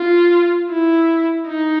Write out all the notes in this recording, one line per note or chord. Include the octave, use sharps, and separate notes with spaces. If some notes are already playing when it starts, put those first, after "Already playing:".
Already playing: F4
E4
D#4